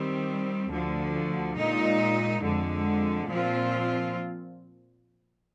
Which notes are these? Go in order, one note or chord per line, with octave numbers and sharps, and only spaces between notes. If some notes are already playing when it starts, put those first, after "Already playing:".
Already playing: D#3 G3 C4
D2 D3 F3
A#2 G#3 D#4
F2 D3 G#3
A#2 F3 C4 F4